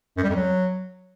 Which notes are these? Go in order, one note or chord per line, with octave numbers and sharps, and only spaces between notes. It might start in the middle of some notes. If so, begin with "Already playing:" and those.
F#2
G3
F2
F#3